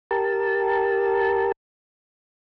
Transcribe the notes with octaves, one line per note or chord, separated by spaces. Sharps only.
G4 A#4 A5